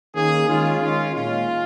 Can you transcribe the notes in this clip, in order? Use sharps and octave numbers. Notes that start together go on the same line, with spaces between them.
D#3 A#3 C#4 G#4
D#3 G#3 C#4 F4
D#3 G#3 C#4 F4
A#2 G#3 C#4 F4